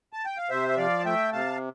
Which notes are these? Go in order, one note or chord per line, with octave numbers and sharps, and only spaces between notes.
A5
G5
F5
C3 C5 E5
E5
F3 D5 F5
A5
A3 E5 G5
C3 F5 A5